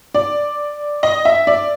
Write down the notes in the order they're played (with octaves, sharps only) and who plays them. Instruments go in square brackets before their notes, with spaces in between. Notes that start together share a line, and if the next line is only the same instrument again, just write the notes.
[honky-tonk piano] D5
D#5
E5
D5